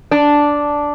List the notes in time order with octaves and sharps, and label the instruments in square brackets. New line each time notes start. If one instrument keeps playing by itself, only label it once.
[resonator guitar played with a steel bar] D4